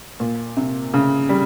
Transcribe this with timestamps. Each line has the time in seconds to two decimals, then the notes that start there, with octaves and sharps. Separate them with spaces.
0.20 A#2
0.57 C3
0.94 C#3
1.29 G3